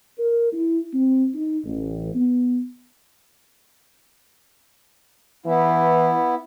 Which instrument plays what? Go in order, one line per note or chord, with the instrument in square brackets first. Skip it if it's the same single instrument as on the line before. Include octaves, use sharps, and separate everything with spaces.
[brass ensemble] A#4
E4
C4
D#4
A1
B3
[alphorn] E3 [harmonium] B3 E4